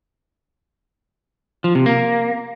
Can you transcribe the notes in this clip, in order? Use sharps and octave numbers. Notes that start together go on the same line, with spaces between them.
F3
C3
A#3